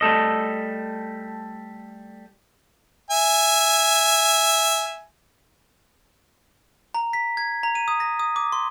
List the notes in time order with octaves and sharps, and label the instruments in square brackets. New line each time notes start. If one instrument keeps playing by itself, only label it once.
[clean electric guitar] G3 A3 A4 D#5
[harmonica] E5 G#5
[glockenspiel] A#5
B6
G#6
A#5
D#7
D#6
A#6
D#6
D6
C6